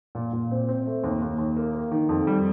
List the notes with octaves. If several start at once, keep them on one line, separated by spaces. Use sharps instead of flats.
A#2
A#2
C4
C4
A3
D#2
D#2
D#2
A#3
A#3
D#3
F2
G3